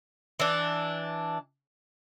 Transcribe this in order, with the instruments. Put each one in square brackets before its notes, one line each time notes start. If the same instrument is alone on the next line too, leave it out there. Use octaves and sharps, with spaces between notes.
[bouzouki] E3 D4